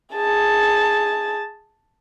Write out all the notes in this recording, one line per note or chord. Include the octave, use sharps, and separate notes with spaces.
G#4 A5